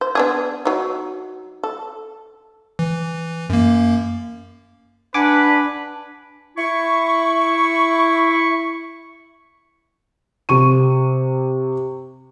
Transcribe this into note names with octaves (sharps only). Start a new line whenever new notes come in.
C5
B3 D4 G#4
F#3 D#4
A4
E3
F#2 A#3
D4 B4 F#5 G#5 D6
E4 C#6
C3 C#6 D#7